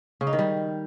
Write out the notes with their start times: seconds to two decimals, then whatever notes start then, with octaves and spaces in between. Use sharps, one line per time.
0.21 C#3
0.27 D#4
0.33 D#3
0.39 G3